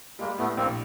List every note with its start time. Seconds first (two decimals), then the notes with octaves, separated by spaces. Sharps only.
0.19 G3 G#3 A#3
0.38 A2 A3 B3
0.57 A#1 A#3 C4